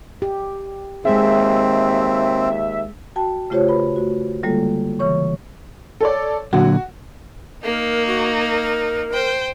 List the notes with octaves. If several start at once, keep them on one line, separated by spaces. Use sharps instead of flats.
G4
D#2 G#3 C4 G#4 E5
F#4 G5 A5
C#3 A3 F4 G4 C5 C#5
F4 B4 B5
A3 F#4
D3 G3 G#3 A#3 F4 A4
C#3 E3 C#5 C#6
A4 C#5 D5
A#2 D3 F#3 F#4
A#3 D#4 A#4
F#4
A#4
C5 G5